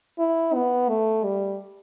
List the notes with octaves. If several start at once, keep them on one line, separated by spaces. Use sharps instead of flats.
E4
B3
A3
G3